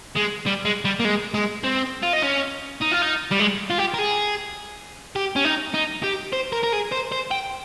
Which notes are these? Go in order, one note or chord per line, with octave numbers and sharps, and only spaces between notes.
G#3
G3
G#3
G3
A#3
G#3
G#3
C4
F4
D#4
C#4
D#4
F4
D#4
G3
G#3
F4
G4
A#4
G#4
G4
C#4
D#4
D#4
G4
C5
A#4
A#4
G#4
C5
C5
G5